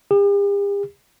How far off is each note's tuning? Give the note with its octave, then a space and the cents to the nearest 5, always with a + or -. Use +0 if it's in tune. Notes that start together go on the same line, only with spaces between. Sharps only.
G4 +45